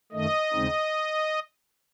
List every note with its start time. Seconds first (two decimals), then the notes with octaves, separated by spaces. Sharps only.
0.12 F#2 D#3 A3 D#5
0.53 D#2 C#3 G#3 C4 D#4